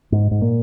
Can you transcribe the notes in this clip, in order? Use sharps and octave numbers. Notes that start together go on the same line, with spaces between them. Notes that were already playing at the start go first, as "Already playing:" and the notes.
G#2
G#2
A#2